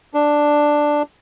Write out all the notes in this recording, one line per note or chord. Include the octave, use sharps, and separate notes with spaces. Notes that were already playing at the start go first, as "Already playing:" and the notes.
D4